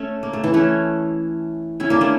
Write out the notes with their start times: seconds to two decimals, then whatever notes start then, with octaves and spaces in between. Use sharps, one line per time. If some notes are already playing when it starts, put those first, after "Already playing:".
Already playing: A3 C#4
0.23 A#3
0.33 A3
0.44 E3
0.54 A3 C#4
1.80 C#4 E4
1.90 A#3 D4
2.01 A3 C#4